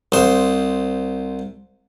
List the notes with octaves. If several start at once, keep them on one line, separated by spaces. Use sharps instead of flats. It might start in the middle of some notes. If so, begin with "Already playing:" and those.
C2 C5